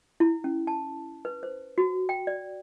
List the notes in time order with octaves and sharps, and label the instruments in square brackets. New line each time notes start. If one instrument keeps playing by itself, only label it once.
[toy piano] E4
C#4
A5
B4
C5
F#4
G5
D5